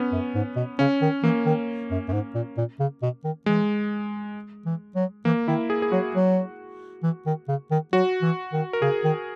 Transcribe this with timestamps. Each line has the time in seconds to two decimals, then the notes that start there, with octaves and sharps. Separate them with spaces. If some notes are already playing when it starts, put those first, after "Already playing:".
Already playing: B3 C#4
0.12 F#2
0.35 G#2
0.56 B2
0.79 C#3 C#4
1.01 D#3
1.23 E3 A#3
1.46 D#3
1.91 F#2
2.08 F#2
2.13 G#2
2.34 A#2
2.57 A#2
2.79 C#3
3.02 B2
3.24 D#3
3.46 E3 G#3
4.65 E3
4.95 F#3
5.25 E3 A#3
5.48 D#3 E4
5.70 G#4
5.82 G#4
5.92 F#3 F#4
6.14 F#3
7.03 E3
7.26 D#3
7.48 C#3
7.71 D#3
7.93 F#3 F#4
8.22 E3
8.53 D#3
8.73 A#4
8.82 C#3 G#4
9.04 D#3